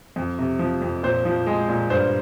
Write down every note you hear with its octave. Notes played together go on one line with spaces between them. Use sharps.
F2
C3
F3
F2
A#2 C5
F3
G#3
A#2
G2 C5